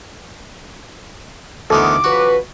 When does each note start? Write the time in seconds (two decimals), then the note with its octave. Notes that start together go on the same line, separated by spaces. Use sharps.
1.70 D2 D#3 E3 B3 A4 D6
2.04 C#3 F3 F#4 B4